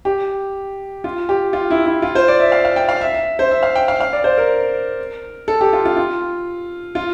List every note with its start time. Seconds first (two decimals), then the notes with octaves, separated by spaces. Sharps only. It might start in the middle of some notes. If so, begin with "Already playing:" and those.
0.05 G4
1.04 F4
1.29 G4
1.53 F4
1.70 E4
1.86 E4
2.02 F4
2.15 C5
2.28 D5
2.40 E5
2.52 F5
2.65 F5
2.76 G5
2.89 F5
3.01 E5
3.14 E5
3.39 C5
3.51 E5
3.63 F5
3.76 G5
3.88 F5
4.00 F5
4.13 D5
4.24 C5
4.38 A#4
5.48 A4
5.61 G4
5.73 F4
5.85 F4
5.97 F4
6.95 F4